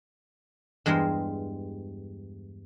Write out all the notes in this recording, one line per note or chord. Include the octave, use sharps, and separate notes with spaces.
E2 G2 G#3 A#4 C5